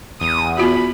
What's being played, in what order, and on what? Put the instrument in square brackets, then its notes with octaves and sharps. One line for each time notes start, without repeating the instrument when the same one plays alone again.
[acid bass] E2 [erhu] D#6
[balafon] B3 F4 F#4 [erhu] B5